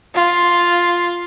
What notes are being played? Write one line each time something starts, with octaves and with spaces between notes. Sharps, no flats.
F4